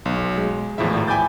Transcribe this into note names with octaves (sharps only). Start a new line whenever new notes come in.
B1
G#3
G#1 E2 A2 F3 E4 E5
G5 G#5 B5 D6 G6 A6